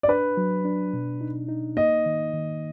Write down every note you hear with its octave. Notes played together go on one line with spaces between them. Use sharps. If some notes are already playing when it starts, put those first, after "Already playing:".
D5
D4 B4
F#3
D4
B2
D#4
D#4
A#3 D#5
D#3
D#3